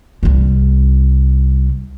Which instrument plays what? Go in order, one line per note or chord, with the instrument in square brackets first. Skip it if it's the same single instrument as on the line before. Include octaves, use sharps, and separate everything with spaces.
[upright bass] C2 G3